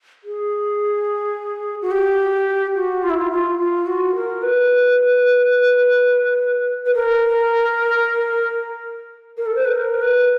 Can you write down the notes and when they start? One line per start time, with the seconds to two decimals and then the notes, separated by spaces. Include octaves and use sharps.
0.24 G#4
1.82 F#4
1.91 G4
2.75 F#4
3.03 F4
3.10 E4
3.18 F4
3.31 F4
3.59 F4
3.87 F#4
4.15 A#4
4.42 B4
6.86 B4
6.95 A#4
9.37 A#4
9.46 A4
9.56 C5
9.65 B4
9.75 A#4
10.02 B4